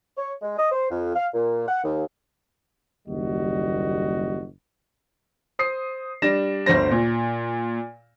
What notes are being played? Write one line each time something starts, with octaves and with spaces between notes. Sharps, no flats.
C#5
G#3
D#5
C5
F2
F5
A#2
F#5
D#2
F#1 D#2 G3 F#4 D#5
C5 D#6 C7
G3 D4 A#6 E7
G1 D2 D3 C5 A#6
A#2